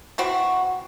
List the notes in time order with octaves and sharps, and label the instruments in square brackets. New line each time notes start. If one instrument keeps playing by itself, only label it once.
[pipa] E3 C4 F#4